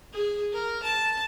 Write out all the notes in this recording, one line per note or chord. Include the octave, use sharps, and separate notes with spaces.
G#4
A#4
A5